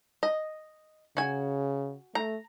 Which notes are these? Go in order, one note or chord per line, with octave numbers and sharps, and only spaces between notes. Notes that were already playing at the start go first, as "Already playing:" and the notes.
D#5
C#3 F#4 G#5
A3 A#5